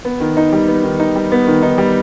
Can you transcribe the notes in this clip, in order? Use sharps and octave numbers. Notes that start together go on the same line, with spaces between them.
B3
D#3
D#4
G3
B3
D#3
D#4
G3
B3
D#3
D#4
G3